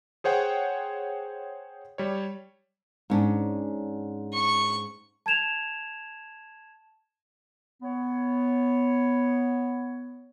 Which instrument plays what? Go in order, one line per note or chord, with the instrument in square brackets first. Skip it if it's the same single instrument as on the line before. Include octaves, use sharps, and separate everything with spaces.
[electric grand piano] G#4 C5 C#5 F#5 G5
G3 C#5
[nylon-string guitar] G#2 C#4 D4
[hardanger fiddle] C#6
[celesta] A5 G#6 E7 F7
[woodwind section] B3 C#5